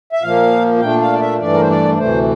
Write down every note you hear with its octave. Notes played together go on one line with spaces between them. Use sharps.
E5
A#2 F3 A#3 F5
A#2 A3 D4 G5
F5
D5
E5
G2 E3 A3 D4 D5
A#4
C5
D5
D2 C3 E3 A3 C5